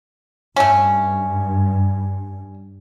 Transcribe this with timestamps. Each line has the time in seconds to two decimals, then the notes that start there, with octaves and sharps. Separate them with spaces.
0.56 G2 A3 C#4